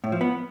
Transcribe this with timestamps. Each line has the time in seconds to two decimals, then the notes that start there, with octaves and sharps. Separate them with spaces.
0.04 A2
0.12 F3
0.21 B3